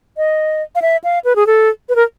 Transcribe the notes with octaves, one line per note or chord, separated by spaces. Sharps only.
D#5
F5
E5
F5
B4
G#4
A4
B4
A#4